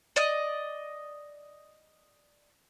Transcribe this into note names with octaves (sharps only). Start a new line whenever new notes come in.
D5 D#5